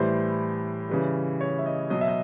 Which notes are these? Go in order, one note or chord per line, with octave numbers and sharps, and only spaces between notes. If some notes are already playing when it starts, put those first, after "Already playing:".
Already playing: A2 E3 G3 C5
C#3 E3 G3
C#5
E5
D#5
B2 F#3 D#5
E5
D#5